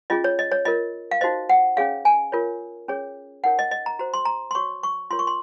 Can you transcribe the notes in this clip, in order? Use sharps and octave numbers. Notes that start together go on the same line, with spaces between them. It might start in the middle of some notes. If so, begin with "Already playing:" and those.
C#4 F4 G#4 D#5
C#5
D#5
C#5
F4 A#4 C#5 D#5
F5
D#4 F#4 C5 D#5
F#5
C#4 G#4 C#5 F5
G#5
F4 A#4 C#5
C#4 G#4 C#5
D#4 A#4 C#5 F#5
D#5
D#5
A#5
F#4 C5 A#5
C6
A#5
C6
F#4 C#5 C#6
C#6
F4 A#4 C#5 C6
C#6
C6